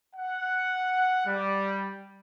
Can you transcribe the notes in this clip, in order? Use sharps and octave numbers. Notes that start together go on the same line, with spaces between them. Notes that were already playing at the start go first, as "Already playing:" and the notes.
F#5
G3